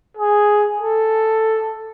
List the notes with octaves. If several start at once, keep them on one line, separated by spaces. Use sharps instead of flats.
G#4
A4